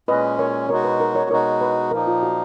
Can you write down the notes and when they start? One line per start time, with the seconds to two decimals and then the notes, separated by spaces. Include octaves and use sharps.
0.08 A#2 G#3 C#4 B4 D#5
0.39 A#4 C#5
0.69 B2 G#3 D#4 F#4 A#4 C#5
0.85 B4
1.00 A#4
1.15 A#4 C#5
1.30 B2 G#3 D#4 F#4 A#4 C#5
1.61 B4
1.91 A#2 F3 A#3 D#4 A#4
2.07 F4
2.23 F#4